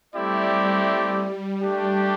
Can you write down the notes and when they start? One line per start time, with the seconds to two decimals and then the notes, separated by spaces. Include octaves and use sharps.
0.13 G3 A3 C4 E4 G4 D5
0.87 G3
1.61 A3 D4 G4